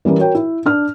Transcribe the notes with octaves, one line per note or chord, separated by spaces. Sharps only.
E3 G3 C#4 A#4
F#4 A#4 C#5 G5
E4
D4 F6